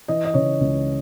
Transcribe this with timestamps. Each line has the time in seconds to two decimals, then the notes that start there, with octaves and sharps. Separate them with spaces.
0.08 E3 D#5
0.25 D#5
0.34 C#3 C#5
0.60 C#2